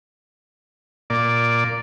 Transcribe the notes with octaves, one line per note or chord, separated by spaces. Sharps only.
A#2 D5